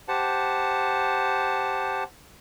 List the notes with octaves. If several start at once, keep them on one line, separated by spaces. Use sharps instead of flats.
G4 C5 F#5 A5